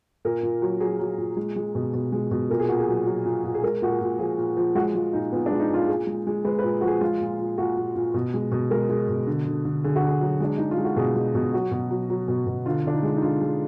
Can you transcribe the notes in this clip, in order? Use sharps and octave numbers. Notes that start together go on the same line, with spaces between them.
A#2 A#4
A#2
F#3
F#3 G#4
F#3
A#2
G#3
G#3
B2
B2
G#3
B2
A#2 A#4
G#4
A#2 F#4
G#4
F#3
F#3
A#2
A#2
G#4
G#3 A#4
A#2 F#4
G#4
A#2
F3 G#4
A#2
F3
G#3 F#4
G#3 F4
A#2 D#4
A#2 B3
D4
G#3
D#4
A#2 F4
A#2 G#4
G#3
G#3
G#3 B4
B4
A#2
F3 F#4
G#4
G#3 F4
A#2
A#2
A#2 F#4
A#2
A#2
B2
G#3
B2
G#3 A#4
G#3
B2
D3
D3
D3
D3 G#4
F#4
D3 G#4
F#3
G#3 D4
G#3 D#4
F4
G#3
F#4
B2 G#4
G#3
B2
F#3 F#4
B2
F#3
F#3
B2
B2
D3 F4
D3 D4
D#4
G#3
D#4
D3 F4
G#3